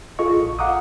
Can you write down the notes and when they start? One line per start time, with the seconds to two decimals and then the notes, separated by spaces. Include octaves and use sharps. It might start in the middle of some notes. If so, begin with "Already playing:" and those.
0.19 F4 G#4 A4 D#5 F5 C#6
0.37 A#1
0.59 F5 F#5 A#5 D6 D#6